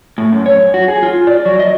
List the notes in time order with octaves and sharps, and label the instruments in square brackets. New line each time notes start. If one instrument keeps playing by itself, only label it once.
[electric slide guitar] A2
F#2
C#5
F#2
F#4
G#4
F4
D5
F#3
D#5